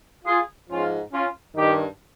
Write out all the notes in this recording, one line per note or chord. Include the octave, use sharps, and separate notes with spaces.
F4 G#4
G#2 F3 C#4 F4
C#4 F4
G2 D#3 D#4 G4